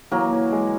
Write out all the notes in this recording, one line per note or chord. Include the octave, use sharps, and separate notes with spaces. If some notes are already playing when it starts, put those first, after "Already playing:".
E3 F#3 A#3
E3
G#3